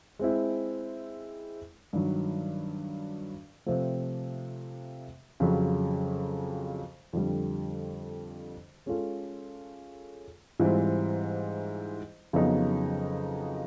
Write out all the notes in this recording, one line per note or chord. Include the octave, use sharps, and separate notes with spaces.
G#3 C4 E4
G2 D#3 F#3
C3 F3 A3 C4
F2 C#3 F#3
F2 D3 G3
G#3 C#4 F4 A4
G#2 E3 G3 C4 F4
F2 C#3 F#3 B3 D#4